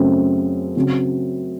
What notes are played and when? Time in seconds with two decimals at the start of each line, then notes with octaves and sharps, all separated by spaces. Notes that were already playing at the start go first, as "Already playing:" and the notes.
Already playing: F#2 C#3 A3 C4 F#4
0.76 C#3 F#3 C4 F#4